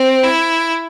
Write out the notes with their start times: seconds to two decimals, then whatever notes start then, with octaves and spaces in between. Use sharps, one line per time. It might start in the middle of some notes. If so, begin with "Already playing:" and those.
Already playing: C4
0.24 E4